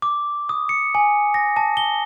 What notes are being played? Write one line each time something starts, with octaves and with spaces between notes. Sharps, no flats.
D6
D#6
C#7
G#5
A#6
A5
G7